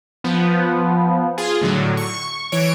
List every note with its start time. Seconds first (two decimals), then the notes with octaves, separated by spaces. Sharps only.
0.24 F3 B3
1.38 F4 G#4
1.61 A2 D3 F#3
1.97 C#6
2.52 E3 C#5 D7